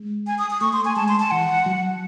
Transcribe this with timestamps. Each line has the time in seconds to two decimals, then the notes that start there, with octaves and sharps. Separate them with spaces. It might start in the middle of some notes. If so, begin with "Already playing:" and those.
Already playing: G#3
0.27 G#5
0.38 D#6
0.50 D#6
0.61 A3 C#6
0.73 C6
0.85 G#5
0.96 G#3 A5
1.08 C6
1.20 A5
1.31 E3 F#5
1.66 F#3